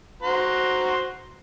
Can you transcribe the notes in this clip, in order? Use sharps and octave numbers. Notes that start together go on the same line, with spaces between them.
F#4 C5 A#5